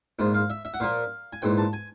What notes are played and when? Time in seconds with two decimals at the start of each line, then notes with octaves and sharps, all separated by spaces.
0.19 A#1 G#2 F3
0.34 F5
0.50 E5
0.65 E5
0.74 F#5
0.80 A#2 F3 A#3 F5
1.33 G#5
1.42 A#1 G#2 E3 G5
1.58 A5
1.73 G#5